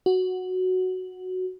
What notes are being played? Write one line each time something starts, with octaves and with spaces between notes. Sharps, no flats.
F#4